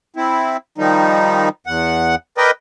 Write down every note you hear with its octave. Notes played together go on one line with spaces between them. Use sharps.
C4 E4
D#3 F3 G3 D#4
E2 F#5
A#4 B4 D5 D#5 G5